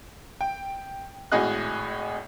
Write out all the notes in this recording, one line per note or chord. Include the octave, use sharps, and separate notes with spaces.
G5
G#1 A2 F#4 G#4 D#5 F#6